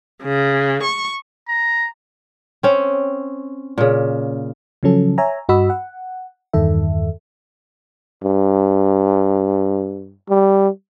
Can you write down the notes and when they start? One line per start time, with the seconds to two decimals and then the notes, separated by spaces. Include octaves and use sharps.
0.21 C#3
0.82 C#6
1.48 A#5
2.63 C4 C#4
3.78 A#2 C#3
4.83 C#3 F3 F#3 C#4 A4
5.18 C#5 E5 G#5 A#5
5.49 G2 F#4 D#5 B5 E6
5.70 F#5
6.53 E2 G2 D#3 A4 E5
8.24 G2
10.30 G3